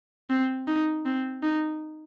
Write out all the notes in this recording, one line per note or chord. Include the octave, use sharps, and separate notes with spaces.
C4
D#4
C4
D#4